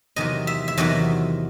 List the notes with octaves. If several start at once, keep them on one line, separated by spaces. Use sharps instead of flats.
E2 C3 D#3 F#3 D#5
E5
E5
E2 C3 D#3 F#3 D#5